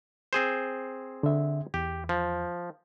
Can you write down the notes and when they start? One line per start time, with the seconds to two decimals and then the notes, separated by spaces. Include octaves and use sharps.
0.33 C4 G#4 C5
1.23 D3 E5
1.74 E2 G4
2.09 F3